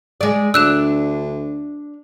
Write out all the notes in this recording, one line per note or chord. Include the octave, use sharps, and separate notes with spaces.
G#3 D5
D2 D4 E6 F#6 E7